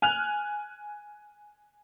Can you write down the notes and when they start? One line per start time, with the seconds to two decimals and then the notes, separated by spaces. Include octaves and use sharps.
0.02 G#5 F6 F#6 F7